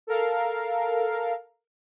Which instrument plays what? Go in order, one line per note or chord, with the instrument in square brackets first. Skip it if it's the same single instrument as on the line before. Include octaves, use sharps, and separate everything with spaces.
[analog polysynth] A4 A#4 F5